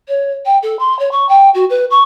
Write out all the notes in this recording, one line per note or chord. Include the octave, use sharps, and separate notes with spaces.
C#5
G5
A4
C6
C#5
C#6
G5
F#4
B4
C#6